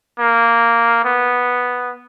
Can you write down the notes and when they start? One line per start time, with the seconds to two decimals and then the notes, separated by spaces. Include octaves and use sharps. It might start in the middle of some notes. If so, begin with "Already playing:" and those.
0.19 A#3
1.05 B3